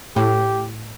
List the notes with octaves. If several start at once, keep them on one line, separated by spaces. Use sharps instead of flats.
A2 G4